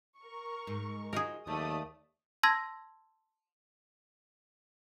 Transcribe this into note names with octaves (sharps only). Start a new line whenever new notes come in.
A#4 C#6
G#2
F3 D#4 F#4 G#4 A#4
D#2 F#3 A3 D#4 D5 D#6
A5 C6 E6 G#6 A#6